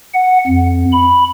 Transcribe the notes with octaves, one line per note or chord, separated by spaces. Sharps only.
F#5
F2
B5